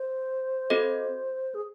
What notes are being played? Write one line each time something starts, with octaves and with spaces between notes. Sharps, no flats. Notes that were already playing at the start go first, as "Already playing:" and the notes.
Already playing: C5
C4 F#4 A4 D#5
G#4